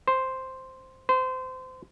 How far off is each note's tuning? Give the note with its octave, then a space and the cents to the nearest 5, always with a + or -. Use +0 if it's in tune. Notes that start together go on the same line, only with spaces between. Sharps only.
C5 +0
C5 -25